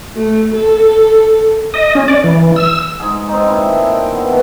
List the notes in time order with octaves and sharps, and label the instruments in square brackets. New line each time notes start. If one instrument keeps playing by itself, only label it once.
[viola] A3
A4
[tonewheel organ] D#5
C#4
D5
E3
E6
[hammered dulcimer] G#2 G#4
C4 D#4
A#2 D#3 D4 E4
G5
B3
B2 E3 A3